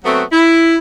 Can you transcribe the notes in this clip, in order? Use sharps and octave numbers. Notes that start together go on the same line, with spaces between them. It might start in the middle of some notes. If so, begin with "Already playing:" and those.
F#3 A3 B3 C4 F#4
E4